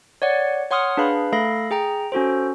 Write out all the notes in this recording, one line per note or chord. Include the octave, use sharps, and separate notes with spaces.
C#5 D5 F#5
C#5 F#5 C6 D#6 F6
D4 G#4 B4 F5 B5
A3 A4 F5 B5 A#6
G#4 G5 A#5
C#4 F#4 A4 C5